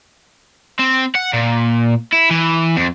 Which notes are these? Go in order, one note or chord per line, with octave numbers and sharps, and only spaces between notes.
C4
F#5
A#2
E4
E3
F2